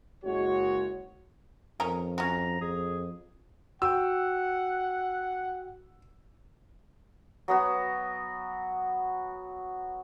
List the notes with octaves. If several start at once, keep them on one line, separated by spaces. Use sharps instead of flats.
F#1 G#3 F#4 C#5
F2 D#3 C#4 A#5
C#4 F#4 A#5
F2 G#4
F#4 F#5 G5 E6
F#3 B3 F#4